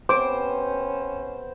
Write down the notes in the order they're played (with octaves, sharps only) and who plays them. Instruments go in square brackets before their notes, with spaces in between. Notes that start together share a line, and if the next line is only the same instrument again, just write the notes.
[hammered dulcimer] C3 B3 [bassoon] C#4 [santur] C5 [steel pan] D6